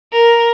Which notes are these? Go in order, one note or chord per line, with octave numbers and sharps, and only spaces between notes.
A#4